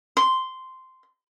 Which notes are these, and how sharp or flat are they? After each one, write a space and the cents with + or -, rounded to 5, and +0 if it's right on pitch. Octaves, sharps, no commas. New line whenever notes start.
C6 -10